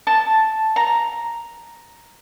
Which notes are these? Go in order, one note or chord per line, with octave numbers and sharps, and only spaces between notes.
A5
A#5